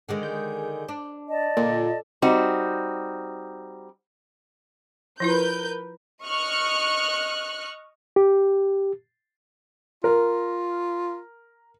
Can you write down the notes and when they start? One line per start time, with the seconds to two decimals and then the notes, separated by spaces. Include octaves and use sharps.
0.09 D3 D#3 G#3
0.23 G#4 G6
0.89 D4
1.29 D5 D#5 A5
1.57 A#2 D3
2.22 G3 C4 D#4 F#4
5.20 F3 E4 F4 A#4 B4 G6
6.24 D#5 C#6 F6 F#6 C#7
8.16 G4
10.04 F4 A#4